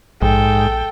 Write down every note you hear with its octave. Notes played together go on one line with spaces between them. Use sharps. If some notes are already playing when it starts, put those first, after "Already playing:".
A#1 G#2 A4 G5